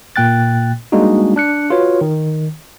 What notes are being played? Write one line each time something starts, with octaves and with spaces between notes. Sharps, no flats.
A#2 A#3 G5 F#6 A6
G3 G#3 A#3 D4 D#4 F#4
D4 F#6 C#7
F4 F#4 B4 C#5
D#3